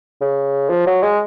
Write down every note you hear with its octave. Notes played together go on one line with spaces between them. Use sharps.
C#3
F3
F#3
G#3